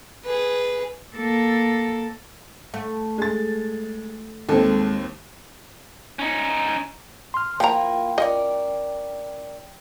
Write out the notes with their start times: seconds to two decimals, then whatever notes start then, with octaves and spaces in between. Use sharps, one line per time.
0.25 G#4 B4
1.16 A#3 A4
2.74 A3
3.18 G#3 A6
4.49 D#2 G#3 C4 A4
6.19 C#4 D#4
7.34 C6 F6
7.60 F3 A#3 E4 F4 G5 A#5
8.18 C#4 F4 A#4 D5 D#5